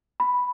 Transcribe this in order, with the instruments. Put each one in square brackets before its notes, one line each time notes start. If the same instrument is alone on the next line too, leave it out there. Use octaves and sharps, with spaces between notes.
[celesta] B5